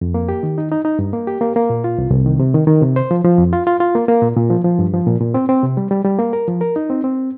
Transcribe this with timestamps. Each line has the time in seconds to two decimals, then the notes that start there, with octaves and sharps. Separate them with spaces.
0.01 F2
0.14 A#3
0.29 G4
0.43 D#3
0.58 D#4
0.72 D#4
0.85 D#4
0.99 G2
1.13 A#3
1.27 G4
1.41 A#3
1.56 A#3
1.70 A#2
1.84 F4
1.98 C2
2.11 C2
2.26 D#3
2.40 C3
2.54 D#3
2.67 D#3
2.81 C3
2.96 C5
3.11 F3
3.24 F3
3.38 F2
3.53 F4
3.67 F4
3.80 F4
3.95 A#3
4.08 A#3
4.22 A#2
4.37 A#2
4.50 F3
4.64 F3
4.79 G2
4.93 F3
5.07 A#2
5.21 A#2
5.34 C4
5.49 C4
5.63 C3
5.77 G3
5.91 G3
6.05 G3
6.19 A#3
6.33 A#4
6.48 F3
6.61 A#4
6.76 D#4
6.90 C4
7.04 C4